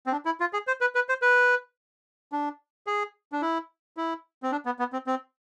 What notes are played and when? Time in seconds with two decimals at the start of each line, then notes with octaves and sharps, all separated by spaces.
0.06 C4
0.12 D4
0.25 E4
0.40 F4
0.53 G#4
0.67 C5
0.81 B4
0.95 B4
1.09 C5
1.22 B4
2.32 D4
2.87 G#4
3.32 D4
3.42 E4
3.97 E4
4.43 C4
4.52 D4
4.65 B3
4.79 B3
4.93 C4
5.07 C4